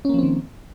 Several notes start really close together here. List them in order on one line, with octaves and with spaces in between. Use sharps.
C#4 A#3 F3 C4 D#3